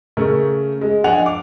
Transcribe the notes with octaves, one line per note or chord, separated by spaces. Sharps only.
C#3 A3 C#4 A#4
G#3
F3 D4 D#5 F#5 G#5 F7
D6